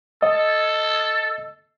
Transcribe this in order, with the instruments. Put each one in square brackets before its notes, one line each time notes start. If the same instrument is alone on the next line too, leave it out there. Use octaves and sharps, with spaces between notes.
[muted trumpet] A4 [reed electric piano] D#5